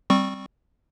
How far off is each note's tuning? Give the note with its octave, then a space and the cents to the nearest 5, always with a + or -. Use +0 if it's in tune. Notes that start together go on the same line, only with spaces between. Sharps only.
G3 +0 C4 +0 C#6 -10